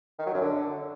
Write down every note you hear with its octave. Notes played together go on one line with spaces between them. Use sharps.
D#3
F#3
F#2
D3